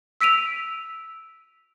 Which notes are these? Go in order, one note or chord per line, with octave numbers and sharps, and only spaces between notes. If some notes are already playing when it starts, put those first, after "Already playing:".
E6 B6 D7 D#7 F7